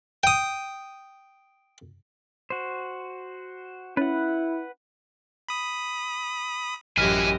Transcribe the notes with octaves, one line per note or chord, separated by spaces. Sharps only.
G5 D#6
F#4 C5
C#4 E4 B4 F#5
B5 D#6
A1 F#2 E4 G4 D#5 G#5 F6 B6